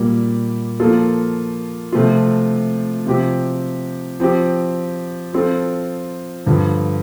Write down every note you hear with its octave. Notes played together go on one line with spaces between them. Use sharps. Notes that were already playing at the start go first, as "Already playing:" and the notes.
Already playing: A#2 G3 A#3
F3 A#3 F4 A4
C3 F3 A3 C4 F4
C3 F3 C4 G4
F3 C4 G4
F3 C4 F4 A4
G2 D3 F3